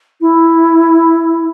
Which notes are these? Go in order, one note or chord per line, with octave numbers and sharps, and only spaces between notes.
E4